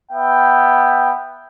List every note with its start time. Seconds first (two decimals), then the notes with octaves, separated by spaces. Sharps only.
0.11 B3 E5 G5